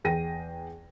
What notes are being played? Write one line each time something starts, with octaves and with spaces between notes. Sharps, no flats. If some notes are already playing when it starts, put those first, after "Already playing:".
E2 G#4 G5 A#6 D#7